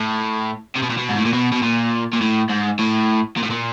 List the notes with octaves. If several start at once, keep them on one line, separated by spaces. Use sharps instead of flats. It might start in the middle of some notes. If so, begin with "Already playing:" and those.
Already playing: A2
C3
B2
A#2
B2
G#2
A2
A#2
B2
B2
A#2
A#2
A2
G#2
A2
A#2
A2
A#2